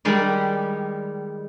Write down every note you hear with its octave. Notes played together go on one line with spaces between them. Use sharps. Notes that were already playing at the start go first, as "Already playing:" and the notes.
D#3 G3 G#3 D5